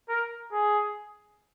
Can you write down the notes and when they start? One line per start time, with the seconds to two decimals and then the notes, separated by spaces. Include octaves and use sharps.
0.09 A#4
0.52 G#4